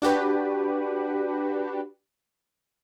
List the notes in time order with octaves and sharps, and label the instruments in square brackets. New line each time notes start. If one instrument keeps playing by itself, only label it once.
[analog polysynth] D4 F#4 G4 B4